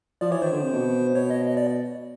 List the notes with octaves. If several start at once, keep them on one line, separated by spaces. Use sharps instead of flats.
F3 D5
E3 C#5
D#3 C5
D3
C3
B2
B2 C#5
D#5
D#5
D5